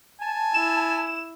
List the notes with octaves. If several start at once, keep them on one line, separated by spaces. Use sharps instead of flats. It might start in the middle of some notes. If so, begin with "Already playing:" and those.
G#5 A5
E4 E7